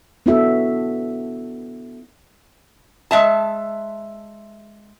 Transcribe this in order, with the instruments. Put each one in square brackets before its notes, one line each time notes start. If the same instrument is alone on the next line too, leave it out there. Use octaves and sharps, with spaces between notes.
[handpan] B3 D4 E4 F#4 A4 E5
[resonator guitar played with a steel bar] G#3 E5 A5